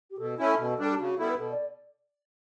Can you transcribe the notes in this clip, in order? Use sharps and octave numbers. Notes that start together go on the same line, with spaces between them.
G4
B2 A4
A3 C#4 E4
A4
B2
G3 D4 A4
G4
C#3 F#4
G3 B3 E4 A4
B4
B2 A4
D5